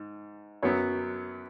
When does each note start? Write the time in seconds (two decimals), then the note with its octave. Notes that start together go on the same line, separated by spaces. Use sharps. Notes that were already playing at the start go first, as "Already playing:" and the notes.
Already playing: G#2
0.62 F#2 F#3 B3 C#5